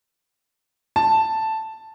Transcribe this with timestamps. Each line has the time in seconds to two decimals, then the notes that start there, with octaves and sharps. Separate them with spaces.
0.96 A5